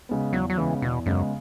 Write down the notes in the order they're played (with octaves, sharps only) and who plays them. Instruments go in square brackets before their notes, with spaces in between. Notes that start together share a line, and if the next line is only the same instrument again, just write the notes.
[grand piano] C#3 G#3 B3
[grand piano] E2 [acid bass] F#3
[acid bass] F#3
[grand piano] C#3 G#3 B3 [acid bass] E3
[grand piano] E2 [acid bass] B2
[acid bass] F#2 [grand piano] C#3 G#3 B3